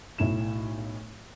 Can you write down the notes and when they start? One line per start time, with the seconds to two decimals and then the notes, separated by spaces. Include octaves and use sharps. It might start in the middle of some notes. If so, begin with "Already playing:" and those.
0.18 B1 A2 E4 E7